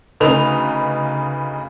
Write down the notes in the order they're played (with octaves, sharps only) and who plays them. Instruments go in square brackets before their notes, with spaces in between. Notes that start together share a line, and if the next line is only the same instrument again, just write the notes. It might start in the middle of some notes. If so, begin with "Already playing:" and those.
[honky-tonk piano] D2 C#3 D#4 B4 F7